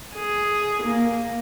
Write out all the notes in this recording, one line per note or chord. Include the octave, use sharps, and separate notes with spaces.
G#4
A#3